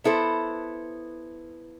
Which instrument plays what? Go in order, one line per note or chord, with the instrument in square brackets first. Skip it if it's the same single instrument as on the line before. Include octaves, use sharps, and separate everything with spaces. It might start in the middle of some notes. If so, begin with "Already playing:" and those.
[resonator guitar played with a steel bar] B3 E4 A4 C5